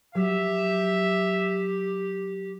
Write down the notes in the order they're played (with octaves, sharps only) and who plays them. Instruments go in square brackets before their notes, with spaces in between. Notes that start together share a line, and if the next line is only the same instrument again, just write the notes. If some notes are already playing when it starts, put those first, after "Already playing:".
[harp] F#3 [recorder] G4 [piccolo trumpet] E5